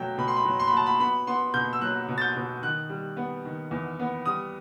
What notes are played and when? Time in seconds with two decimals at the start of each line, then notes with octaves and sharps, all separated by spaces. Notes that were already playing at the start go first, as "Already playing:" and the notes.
Already playing: B2 F#3 A3 G5
0.18 B2 B5
0.28 C6
0.36 B5
0.45 F#3
0.59 C6
0.68 B5
0.73 F#3 A5
0.86 B5
1.00 B3 B5
1.27 B3 C6
1.54 B2 G6
1.73 E6
1.81 F#3 F#6
2.08 B2
2.18 A6
2.21 G6
2.36 B2
2.62 D#3 F#6
2.90 G3
3.17 B3
3.45 D#3
3.71 E2
4.00 B3
4.26 G3 D#6